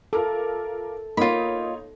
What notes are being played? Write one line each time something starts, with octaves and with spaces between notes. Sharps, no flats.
F4 A4 A#4 D6
A#3 D#4 F4 C#5 B5